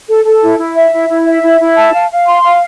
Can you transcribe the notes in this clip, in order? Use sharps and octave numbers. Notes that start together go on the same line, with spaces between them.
A4
A4
E4
E4
E5
E4
E4
E5
E4
E4
A5
F5
F5
C6
F5